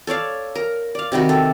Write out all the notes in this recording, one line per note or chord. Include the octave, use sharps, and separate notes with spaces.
A4 C#5 D5 F5
A#4
D5 F5
C3 D#3 G3 F#4
A4